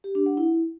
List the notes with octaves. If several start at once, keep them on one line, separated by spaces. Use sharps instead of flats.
G4
D4
F#5
E4